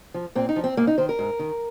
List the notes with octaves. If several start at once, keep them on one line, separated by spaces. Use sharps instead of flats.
F3
A#2 C4
D#4
F3
C4
G#2 A#3
D#4
D#3 C5
A#4
G#2
D#3